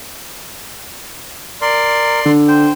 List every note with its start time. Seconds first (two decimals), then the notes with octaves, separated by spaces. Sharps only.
1.61 A#4 D5 C6
2.26 D3
2.48 C5 G5